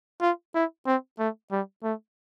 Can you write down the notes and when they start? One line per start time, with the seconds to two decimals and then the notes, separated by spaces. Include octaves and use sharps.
0.21 F4
0.55 E4
0.86 C4
1.19 A3
1.51 G3
1.83 A3